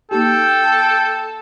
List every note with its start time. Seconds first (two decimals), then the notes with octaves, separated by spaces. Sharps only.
0.11 A#3 D#4 G4 A4 G5